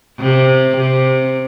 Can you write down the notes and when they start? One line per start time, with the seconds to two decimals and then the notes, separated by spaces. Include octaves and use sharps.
0.19 C3
0.77 C3